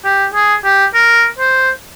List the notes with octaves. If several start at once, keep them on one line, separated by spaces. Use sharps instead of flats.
G4
G#4
G4
A#4
C5